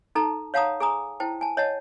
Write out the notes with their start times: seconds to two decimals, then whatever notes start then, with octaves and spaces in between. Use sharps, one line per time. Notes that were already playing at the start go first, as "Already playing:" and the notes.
0.15 D#4 A4 A5 A#5
0.54 C#5 F5 F#5 A5 A#5 D#6
0.80 G#4 G#5 A#5 D#6
1.20 E4 C5 G5 A5
1.41 G#5 A5
1.57 C#5 D#5 F#5 A5